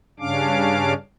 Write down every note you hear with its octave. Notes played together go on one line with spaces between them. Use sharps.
G2 C#3 C#4 D4 F5 D6